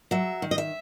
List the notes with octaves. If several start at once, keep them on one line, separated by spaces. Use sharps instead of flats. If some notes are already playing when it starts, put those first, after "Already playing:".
F#3 E5
D#3
D#5
E5